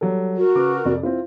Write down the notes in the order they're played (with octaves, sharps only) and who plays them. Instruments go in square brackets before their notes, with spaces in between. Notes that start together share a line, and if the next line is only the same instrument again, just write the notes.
[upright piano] F#3 G3 A4
[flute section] F#4 A#4
[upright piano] C#3 B4 D6
F2 C3 D5
C4 E4 F4